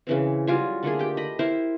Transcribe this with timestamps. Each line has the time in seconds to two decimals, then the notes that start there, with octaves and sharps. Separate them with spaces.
0.07 C#3 E3 C4
0.47 F#3 G3 F4 G#5
0.83 D3 A3 A#3 G#4
0.99 G4 G5
1.17 D#5 B5
1.39 E4 A#4 C5